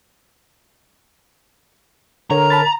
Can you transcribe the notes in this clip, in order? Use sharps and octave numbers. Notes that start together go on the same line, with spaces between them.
D3 A#4 C#5 A#5
A5 B5 A6